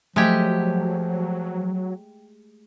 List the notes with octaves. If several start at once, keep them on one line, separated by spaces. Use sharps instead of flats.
F3 F#3 G#3 A3 G4 G#6 B6